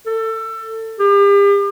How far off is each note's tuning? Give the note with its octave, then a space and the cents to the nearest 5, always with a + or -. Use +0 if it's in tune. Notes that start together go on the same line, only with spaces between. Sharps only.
A4 +25
G4 +40